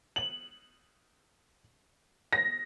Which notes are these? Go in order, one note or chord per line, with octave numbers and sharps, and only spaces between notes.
F#7
A#6